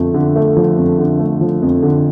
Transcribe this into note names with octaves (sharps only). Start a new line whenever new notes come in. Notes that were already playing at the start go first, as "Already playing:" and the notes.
Already playing: F2 D3 F3 A3
D3
A3
F3
F2
D3
A3
F3
F2
D3